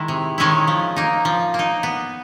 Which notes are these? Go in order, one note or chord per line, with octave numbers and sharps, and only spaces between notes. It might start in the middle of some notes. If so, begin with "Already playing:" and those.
Already playing: D#3 G#3 E4
C3
D#3 G#3 C#4 E4
F3
A#3 D#4
F3
A#3 D#4
B3